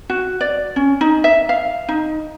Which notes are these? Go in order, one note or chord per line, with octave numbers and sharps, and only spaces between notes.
F#4
D5
C#4
D#4
E5
F5
D#4